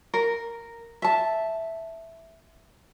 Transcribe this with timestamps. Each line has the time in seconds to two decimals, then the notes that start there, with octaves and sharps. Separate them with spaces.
0.14 A#4
1.02 E5 A5